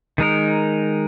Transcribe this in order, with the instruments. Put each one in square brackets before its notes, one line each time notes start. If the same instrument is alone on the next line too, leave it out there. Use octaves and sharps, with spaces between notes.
[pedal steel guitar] D#3 G#3 D#4 A#4